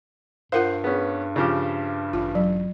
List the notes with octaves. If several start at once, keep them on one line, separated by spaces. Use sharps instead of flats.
G2 F4 A#4 C5 F5 F#5
B3 C#4 G#4
C#3 F3 G4
A1 F4
F#3